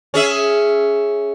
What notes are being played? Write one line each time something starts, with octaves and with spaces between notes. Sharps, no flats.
C#4 G#4 E5